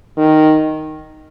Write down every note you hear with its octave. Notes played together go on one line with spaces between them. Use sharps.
D#3